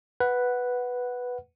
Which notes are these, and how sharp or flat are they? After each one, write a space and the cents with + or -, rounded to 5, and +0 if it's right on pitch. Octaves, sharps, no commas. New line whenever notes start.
B4 +0 F#5 +0